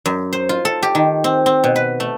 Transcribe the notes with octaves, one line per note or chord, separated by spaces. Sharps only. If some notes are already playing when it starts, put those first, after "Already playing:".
F#2
C5
F4
A4
G4
D#3
C4
C4
B2
B4
A3